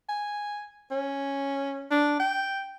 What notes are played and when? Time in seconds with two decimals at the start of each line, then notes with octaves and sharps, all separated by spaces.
0.09 G#5
0.91 C#4
1.91 D4
2.19 G5